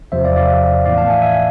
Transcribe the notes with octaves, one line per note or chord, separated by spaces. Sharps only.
E2 C3 F3 C5 E5
D5 F5
D5 F5
A2 E3 B3 D5 F5
F5 A5
E5 G#5
E5 G#5